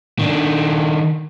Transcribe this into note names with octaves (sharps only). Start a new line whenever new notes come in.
D#3 D4